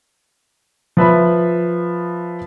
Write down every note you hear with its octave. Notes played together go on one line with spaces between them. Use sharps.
F3 B4 E5 B5